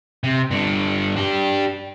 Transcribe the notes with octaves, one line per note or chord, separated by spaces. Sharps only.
C3
G2 D3
D4 G4